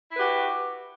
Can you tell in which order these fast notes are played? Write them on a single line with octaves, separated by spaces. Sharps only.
E4 B4 G4 F#4